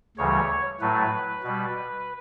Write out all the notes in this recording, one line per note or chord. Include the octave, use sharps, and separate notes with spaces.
D2 C#3 E3 G3 C#5
A2 F#3 A3 B4
B2 G3